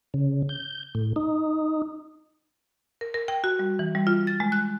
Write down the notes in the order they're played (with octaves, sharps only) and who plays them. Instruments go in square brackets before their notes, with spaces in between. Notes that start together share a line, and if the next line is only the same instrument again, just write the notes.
[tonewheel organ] C#3
G6
A2
D#4
[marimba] A#4
A#4
G5
F#4
G3
E3
G3
F4
A6
G#3
F#6